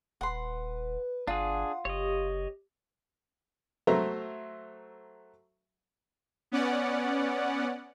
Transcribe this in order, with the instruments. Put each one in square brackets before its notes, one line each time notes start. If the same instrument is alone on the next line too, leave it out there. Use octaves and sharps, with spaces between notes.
[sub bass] D#1 [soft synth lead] B4 [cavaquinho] F#5 C6
[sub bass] G1 [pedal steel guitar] D4 G#4 [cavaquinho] F4 [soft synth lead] F#5
[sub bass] F#1 [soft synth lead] G4 [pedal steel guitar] C#5 D#5
[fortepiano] F#3 A3 C5 E5 A#5
[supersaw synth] B3 C#4 D5 F#5